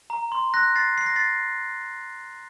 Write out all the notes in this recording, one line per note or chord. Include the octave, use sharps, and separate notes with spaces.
A#5
C6
F#6 A#6
A6 C7
C7
A#6
A6 C7